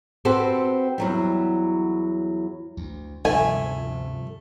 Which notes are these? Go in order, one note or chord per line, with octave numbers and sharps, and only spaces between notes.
C4 F#4 G4 A4 B4 C5
E2 F#3 G3
D2
D2 G2 C3 F3 G3 A3 G#5